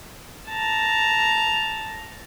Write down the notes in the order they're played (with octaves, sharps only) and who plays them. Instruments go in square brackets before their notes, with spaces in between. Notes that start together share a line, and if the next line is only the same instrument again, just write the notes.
[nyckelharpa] A5 A#5